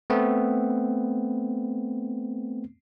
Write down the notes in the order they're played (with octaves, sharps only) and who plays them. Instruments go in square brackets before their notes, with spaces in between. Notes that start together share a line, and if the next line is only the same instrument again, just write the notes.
[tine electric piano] A3 B3 C4